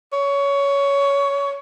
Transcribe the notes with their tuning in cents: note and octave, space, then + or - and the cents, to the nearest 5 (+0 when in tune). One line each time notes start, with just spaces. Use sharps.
C#5 +15